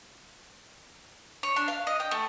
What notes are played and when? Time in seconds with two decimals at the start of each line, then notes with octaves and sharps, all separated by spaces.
1.43 C#5
1.56 D4
1.68 F5
1.87 D#5
2.00 G5
2.11 A3